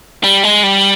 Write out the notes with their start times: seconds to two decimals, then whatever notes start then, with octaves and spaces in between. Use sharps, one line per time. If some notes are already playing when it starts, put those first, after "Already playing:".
0.24 G3
0.44 G#3
0.63 G3